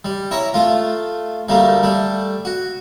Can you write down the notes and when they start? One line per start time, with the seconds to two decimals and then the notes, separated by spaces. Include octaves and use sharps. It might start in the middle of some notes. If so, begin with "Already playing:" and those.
0.05 G3
0.31 E4 C#5 A#5
0.54 A3 F4
1.49 D2 G3 A3 A#3
1.83 G3 A3
2.45 F#4